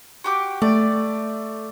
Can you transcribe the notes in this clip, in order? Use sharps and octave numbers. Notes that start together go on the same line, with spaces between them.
F#4 G4 D6
A3 D5